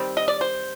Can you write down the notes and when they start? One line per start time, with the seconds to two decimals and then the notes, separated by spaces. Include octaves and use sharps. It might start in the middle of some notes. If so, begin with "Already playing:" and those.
Already playing: D#3 G3 C4
0.17 D#5
0.28 D5
0.41 C5